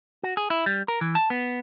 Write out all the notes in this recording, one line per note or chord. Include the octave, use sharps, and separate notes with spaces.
F#4
G#4
E4
G3
A#4
E3
A5
B3